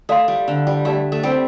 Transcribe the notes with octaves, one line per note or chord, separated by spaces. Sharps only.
A3 A4 D5 F5 C6
G3
D3
G3
A3 G4 D5 A5
A3
G3 C4